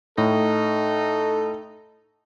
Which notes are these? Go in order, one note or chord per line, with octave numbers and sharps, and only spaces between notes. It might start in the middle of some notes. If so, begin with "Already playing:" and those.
A2 D#4 A4